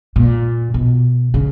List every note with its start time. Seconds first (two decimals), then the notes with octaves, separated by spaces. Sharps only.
0.16 A#2
0.74 B2
1.34 C#3